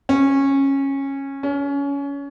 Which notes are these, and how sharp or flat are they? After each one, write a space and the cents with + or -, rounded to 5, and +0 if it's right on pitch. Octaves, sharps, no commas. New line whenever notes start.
C#4 -15
C#4 +25